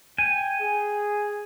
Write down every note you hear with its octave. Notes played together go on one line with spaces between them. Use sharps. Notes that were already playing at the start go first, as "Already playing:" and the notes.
G5 G#5
G#4